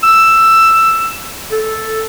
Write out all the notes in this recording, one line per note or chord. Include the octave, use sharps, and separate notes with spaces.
E6
A4